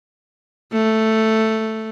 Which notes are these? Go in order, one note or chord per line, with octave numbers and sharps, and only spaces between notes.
A3